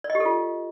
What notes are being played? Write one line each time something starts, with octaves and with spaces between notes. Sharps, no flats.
D5
D#5
G4
A4
F4